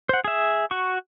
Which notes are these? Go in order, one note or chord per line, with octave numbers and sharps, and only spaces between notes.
C5 F#5
G#4 E5
F#4 C#6